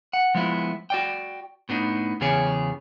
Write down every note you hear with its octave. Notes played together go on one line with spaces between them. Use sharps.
F#5
F3 G#3 B3 E4
F#4 D5 G5
A2 B3 D4 D#4
E2 C#3 B3 G4 G#4 C#5